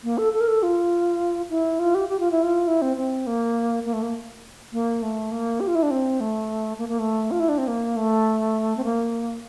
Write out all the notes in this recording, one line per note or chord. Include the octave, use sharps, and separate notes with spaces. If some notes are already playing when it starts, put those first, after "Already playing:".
A#3
A4
A4
A#4
A4
F4
E4
F4
G4
G4
F4
E4
F4
E4
C4
C4
A#3
A#3
A3
A#3
A#3
A3
A#3
G4
F4
E4
D4
C4
A3
A#3
A#3
A3
F4
E4
D4
C4
A#3
A3
C4
A#3